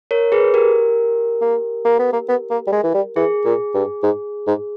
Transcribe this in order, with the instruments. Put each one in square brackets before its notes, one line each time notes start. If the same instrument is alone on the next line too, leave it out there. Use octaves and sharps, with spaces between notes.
[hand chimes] A#4 C#5
G#4 B4
G4 A#4
[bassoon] A#3
A#3
B3
A#3
B3
A#3
G3
G#3
E3
G3
[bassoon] E3 [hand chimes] G#4
[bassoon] A#2
G2
G#2
G#2